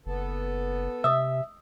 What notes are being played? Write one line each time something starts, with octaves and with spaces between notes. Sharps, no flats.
F#1 B3 A4
C3 D#5 E5 D#6 E6